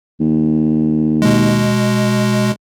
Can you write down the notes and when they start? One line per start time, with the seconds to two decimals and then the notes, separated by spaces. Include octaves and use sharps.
0.20 D#2
1.22 B2 G#3